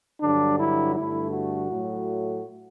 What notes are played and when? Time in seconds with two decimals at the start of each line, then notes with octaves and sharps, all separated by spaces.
0.21 G2 D3 F#3 D4
0.59 E4
0.95 G2 D3 A3 E4
1.32 F#4
1.68 A2 F#3 A3